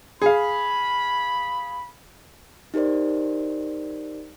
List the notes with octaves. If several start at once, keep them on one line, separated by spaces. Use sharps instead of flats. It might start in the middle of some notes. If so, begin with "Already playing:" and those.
G#4 F5 B5
D#4 G4 A#4 C5 D5